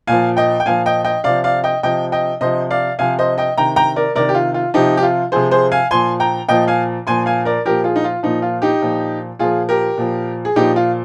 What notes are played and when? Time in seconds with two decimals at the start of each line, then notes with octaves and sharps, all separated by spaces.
0.07 A#2 F3 F5 G#5
0.37 D#5 G5
0.60 G5
0.66 A#2 F3 F5 G#5
0.86 D#5 G5
1.05 D#5 G5
1.24 C3 F3 D5 F5
1.44 D5 F5
1.64 D#5 G5
1.83 C3 F3 D#5 G5
2.12 D#5 G5
2.41 C3 F3 C5 D#5
2.71 D5 F5
2.99 C3 F3 F5 G#5
3.19 C5 D#5
3.38 D#5 G5
3.57 C3 D#3 G5 A#5
3.76 G5 A#5
3.96 A#4 D5
4.15 C3 D#3 A#4 D5
4.29 G4
4.35 F4
4.54 F4
4.74 C3 F3 D#4 G4
4.97 G4
5.03 F4
5.32 C3 F3 G#4 C5
5.51 G#4 C5
5.72 F5 G#5
5.91 A#2 F3 G#5 C6
6.20 G5 A#5
6.49 A#2 F3 D#5 G5
6.68 F5 G#5
7.07 A#2 F3 G#5 C6
7.26 F5 G#5
7.45 A#4 D5
7.65 A#2 F3 G4 A#4
7.84 F4 G#4
7.96 D#4
8.04 F4
8.23 A#2 F3 D#4
8.42 F4
8.62 D#4 G4
8.82 A#2 F3
9.39 A#2 F3 F4 G#4
9.69 G4 A#4
9.98 A#2 F3
10.45 G#4
10.56 A#2 F3 D#4 G4
10.76 F4